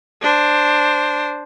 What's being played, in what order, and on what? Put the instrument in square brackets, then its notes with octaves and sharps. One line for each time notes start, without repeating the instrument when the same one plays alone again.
[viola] D4 C5